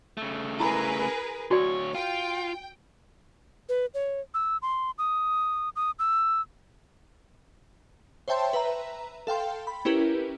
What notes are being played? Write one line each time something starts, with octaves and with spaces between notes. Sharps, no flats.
C#3 A3
E4 G#4 A#4 B4 B5
D2 F#4 C#5 D5
F4 G5
B4
C#5
E6
C6
D#6
D#6
E6
C5 C#5 E5 G5 A5 C6
B4 E5 A#5
A4 F5 G5 C6
B5
C#4 E4 G4 A#4 B4